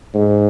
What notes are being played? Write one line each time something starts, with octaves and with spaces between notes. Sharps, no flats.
G#2